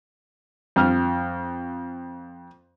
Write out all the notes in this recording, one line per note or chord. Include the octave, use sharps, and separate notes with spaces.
F2 F6